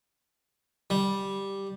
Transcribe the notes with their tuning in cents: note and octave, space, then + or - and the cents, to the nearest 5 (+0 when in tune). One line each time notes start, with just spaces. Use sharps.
G3 +0